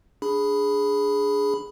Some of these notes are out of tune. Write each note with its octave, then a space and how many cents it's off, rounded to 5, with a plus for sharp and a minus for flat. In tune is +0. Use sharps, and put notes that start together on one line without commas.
D4 -5 G#4 +0 B5 +0